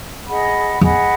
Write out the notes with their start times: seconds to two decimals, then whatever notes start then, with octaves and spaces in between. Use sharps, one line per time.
0.26 G#4 D#5 F#5 B5
0.81 E2 G#4 D#5 F#5 B5